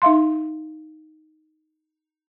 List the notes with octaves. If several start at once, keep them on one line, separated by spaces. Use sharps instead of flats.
D#4 E5 F5 C6